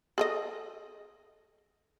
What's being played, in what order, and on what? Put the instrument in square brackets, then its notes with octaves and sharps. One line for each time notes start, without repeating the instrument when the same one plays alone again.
[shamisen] G#4 A4 D#5